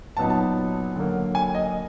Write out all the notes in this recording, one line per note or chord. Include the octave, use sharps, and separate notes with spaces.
A#2 F#3 B3 D#4 A5
A5
D3 F#3 A#3
G#5
D#5